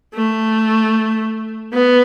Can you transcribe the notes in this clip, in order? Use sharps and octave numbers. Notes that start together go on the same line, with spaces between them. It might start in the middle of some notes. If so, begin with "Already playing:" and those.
A3
B3